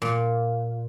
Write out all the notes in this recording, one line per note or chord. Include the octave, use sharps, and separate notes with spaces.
A#2